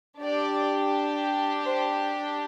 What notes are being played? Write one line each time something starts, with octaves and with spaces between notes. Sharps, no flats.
D4 G4 D5
C5